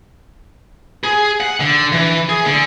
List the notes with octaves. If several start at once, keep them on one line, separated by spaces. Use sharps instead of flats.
G#4
F#5
D3
E3
G#4
D3